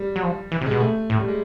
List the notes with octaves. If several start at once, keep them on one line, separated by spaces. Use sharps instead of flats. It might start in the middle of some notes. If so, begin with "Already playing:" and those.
Already playing: G3
F#3
F3
E3
C3
G#3
B2
A3
A2
G3
G#3